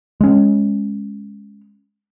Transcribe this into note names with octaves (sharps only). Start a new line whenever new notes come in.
G#3 C#4